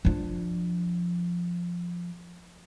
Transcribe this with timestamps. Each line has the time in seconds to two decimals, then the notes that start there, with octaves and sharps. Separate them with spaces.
0.05 F3 D4